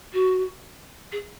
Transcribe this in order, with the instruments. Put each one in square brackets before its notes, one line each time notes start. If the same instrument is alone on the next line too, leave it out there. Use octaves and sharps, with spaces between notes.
[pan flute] F#4
G#4